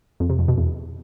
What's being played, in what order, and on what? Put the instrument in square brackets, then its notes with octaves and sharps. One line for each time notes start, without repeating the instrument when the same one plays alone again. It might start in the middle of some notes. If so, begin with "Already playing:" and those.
[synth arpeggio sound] F2
C3
F2
B2
E2